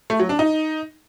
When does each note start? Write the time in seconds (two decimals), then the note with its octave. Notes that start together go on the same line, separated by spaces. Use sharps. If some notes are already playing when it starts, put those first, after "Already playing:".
0.10 A3
0.20 F#3
0.29 D4
0.39 D#4